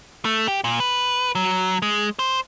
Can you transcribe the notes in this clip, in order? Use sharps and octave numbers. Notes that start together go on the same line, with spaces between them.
A3
G4
A#2
B4
F#3
G#3
C5